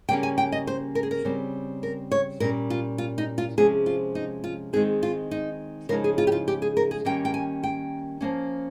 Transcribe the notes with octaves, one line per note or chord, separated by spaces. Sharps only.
C#3 G3 A#3 C#4 G5
G#5
G5
D#5
C5
A#4
G#4
A#4
C#3 G3 C4
A#4
C#5
A#2 G3 C#4 A#4
F4
F4
D#4
F4
C3 F3 G#3 C#4 G#4
F4
D#4
F4
D#3 G#3 C4 D#4 G#4
F4
D#4
C#3 F3 G#3 D#4 A#4
G#4
F4
G4
F4
G4
G#4
A#4
G#4
D#3 G3 A#3 C#4 G5
G5
G#5
G5
F3 A#3 C#4